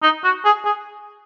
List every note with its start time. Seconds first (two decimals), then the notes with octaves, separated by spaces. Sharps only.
0.03 D#4
0.24 F#4
0.45 G#4
0.65 G#4